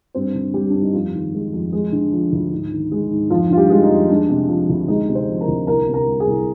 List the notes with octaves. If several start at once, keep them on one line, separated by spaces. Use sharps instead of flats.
G2 C4 C5
D3
G3 G4
G2 D4
D#4
F2 F3 F4
D#3
G#3
F2
G#3
D3
F3
D2
G#2
D#3
G#3
G#2
F2 F3 F4
D3 F4
G3 G4
G#3 F4
D#4
F2
G#3 D4
C3
F3
D2
G#3 D#4
C3
C4 C5
F3
A#4 A#5
D2
C2 A#4 A#5
C3
A#4 A#5
G3
G#4 G#5
C2